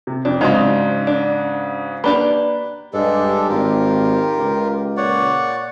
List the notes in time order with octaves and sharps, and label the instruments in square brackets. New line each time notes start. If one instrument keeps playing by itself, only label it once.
[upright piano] C3
[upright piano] F2 [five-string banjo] D4
[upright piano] G#2 C#3 F#3 [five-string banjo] C4 D4 D#4
[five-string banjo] D4
[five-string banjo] A#3 D4 G4 [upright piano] B4 B5 G7
[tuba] G2 [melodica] G#3 D4 A4 [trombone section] G4
[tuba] G#1 [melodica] F4 A#4
[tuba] C#2
[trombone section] A#2 [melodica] C#5 D5 F#5